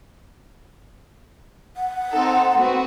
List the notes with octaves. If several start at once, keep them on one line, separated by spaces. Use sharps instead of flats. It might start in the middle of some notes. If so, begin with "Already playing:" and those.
F#5
C4 D#4 A4
B3 C4 F#4